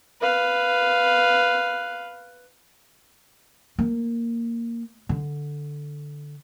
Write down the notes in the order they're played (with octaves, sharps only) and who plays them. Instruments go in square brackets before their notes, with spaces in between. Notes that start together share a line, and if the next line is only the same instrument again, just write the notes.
[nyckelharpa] B4 F5
[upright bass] A#3
D3